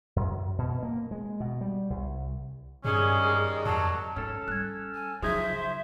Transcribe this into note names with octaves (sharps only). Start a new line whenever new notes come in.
F#2
B2
A#3
G#3
B2
G3
C2
G2 D#3 G3 G#3 C#4 G#4
F2 F#3 A5
G#2 C#4 A4
G3 F#6 G#6
G#5
C#3 F3 F#3 D#4 G#4 E5 D#6 G#6
C5